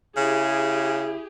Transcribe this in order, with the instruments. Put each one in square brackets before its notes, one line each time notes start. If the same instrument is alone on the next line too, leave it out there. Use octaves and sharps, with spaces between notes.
[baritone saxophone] C#3 [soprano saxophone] E4 [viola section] G4 G#4